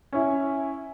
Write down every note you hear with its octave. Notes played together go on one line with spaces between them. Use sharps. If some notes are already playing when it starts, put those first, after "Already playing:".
C#4 E4